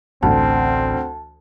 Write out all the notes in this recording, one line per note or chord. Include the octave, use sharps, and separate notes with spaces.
A1 D2 C4 A5